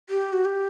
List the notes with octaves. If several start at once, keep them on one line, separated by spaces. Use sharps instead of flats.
G4
F#4
G4